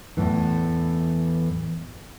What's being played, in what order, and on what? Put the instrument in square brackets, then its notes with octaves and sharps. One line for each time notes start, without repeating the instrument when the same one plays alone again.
[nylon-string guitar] E2 A2 E3